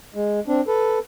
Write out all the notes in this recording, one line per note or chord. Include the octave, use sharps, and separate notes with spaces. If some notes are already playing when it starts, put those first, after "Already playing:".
G#3
C4 D4
A4 B4